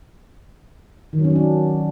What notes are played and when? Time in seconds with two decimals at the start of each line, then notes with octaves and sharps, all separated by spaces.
1.13 D#3
1.19 F#3
1.24 C#4
1.30 F#3
1.36 D4